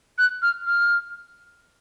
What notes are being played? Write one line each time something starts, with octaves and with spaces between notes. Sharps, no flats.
F#6
F6
F6